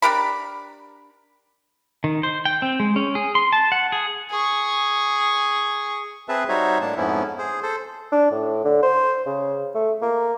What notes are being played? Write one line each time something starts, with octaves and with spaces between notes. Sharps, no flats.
D4 G4 A#4 B5
D#3
C5
G5
C4
G#3
C#4
G#4
C6
A5
F#5
G#4
G#4 C#6
C4 G#4 B4 E5 A5
G3 D#4 F#4 C5 C#5 E5
A2 A#3 D4 A5
F2 G#2 F3 B3 C#4 E4
G#4 C5
A4 C5
D4
A2
D3
C5
C#3
A3
A#3